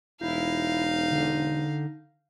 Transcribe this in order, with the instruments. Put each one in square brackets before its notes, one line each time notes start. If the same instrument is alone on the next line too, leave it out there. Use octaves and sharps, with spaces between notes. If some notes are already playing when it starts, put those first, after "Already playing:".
[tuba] E1 [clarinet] D#4 [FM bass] E4 [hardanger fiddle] F5
[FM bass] D3